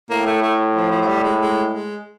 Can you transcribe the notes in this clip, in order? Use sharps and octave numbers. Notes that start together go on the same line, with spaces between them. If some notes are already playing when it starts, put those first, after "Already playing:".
A2 A#3
A3
A3
F3
F3
F#3
G3
G#3
G#3
G#3